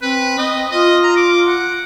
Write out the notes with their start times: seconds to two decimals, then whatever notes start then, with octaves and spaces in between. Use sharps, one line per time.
0.02 C4 B4
0.38 C4 D#5
0.71 F4 D#5
1.03 A#5
1.16 D6
1.47 F#5